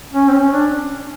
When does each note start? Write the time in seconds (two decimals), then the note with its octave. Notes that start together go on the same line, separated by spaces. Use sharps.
0.14 C#4
0.28 C4
0.33 C#4
0.52 D4